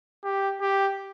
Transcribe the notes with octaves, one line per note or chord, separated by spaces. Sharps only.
G4
G4